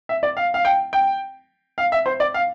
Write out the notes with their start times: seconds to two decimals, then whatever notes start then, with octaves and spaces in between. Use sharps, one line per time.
0.09 E5
0.23 D5
0.37 F5
0.54 F5
0.65 G5
0.93 G5
1.78 F5
1.92 E5
2.06 C5
2.20 D5
2.34 F5